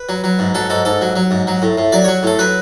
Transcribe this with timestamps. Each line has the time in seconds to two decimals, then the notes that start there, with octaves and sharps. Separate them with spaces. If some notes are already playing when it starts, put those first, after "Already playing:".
Already playing: B4
0.09 F#3
0.24 F#3
0.39 G#2
0.55 F#3 A4
0.70 G#2 A4
0.85 G#2 A4
1.01 F#3
1.16 F#3
1.31 G#2
1.47 F#3
1.62 A2
1.77 A2
1.92 F#3 D5
2.04 F#3 C#5
2.23 A2 A4
2.39 F#3 B4